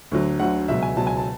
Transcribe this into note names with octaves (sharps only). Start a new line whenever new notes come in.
D2 D3 F#3
D2 D3 F#3 F#5
C#2 B2 F#3 E5
G#5
C#2 B2 F#3 A5
G#5
A5